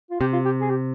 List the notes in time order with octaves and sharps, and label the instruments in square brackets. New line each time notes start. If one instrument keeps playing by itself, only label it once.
[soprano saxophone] F4
[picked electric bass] C3 [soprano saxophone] G4
[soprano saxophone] F4
G4
G#4
G4